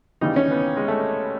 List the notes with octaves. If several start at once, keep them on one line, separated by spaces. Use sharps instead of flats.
D#2 C#3 E3 G3 D#4
C#4
B3
G#3
A3